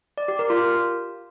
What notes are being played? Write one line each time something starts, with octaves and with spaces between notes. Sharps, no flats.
D5
G4
A#4
F4